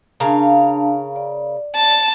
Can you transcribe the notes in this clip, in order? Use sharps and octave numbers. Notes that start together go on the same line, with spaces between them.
C#3 D4 A#4 F5 A5
D5
A5